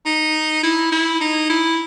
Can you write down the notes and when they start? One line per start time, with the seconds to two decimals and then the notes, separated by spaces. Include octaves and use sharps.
0.06 D#4
0.63 E4
0.92 E4
1.21 D#4
1.50 E4